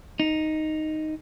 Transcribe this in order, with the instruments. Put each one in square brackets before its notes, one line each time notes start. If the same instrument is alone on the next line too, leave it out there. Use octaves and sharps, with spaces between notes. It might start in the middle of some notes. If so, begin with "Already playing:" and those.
[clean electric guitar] D#4